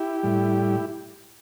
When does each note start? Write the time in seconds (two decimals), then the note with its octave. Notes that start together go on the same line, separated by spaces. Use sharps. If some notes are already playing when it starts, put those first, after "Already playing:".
Already playing: E4 G4
0.23 A2 G3